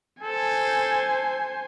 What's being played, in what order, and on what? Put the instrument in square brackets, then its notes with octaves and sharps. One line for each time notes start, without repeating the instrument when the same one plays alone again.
[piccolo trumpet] A4 [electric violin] C5 G#5